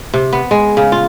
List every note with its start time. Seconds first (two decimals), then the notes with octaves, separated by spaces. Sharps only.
0.14 C3
0.33 B3
0.51 G#3
0.77 C#3
0.92 F4